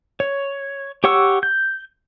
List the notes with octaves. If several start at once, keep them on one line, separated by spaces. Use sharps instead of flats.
C#5
G4 C#5 F#5 C#6 E6
G6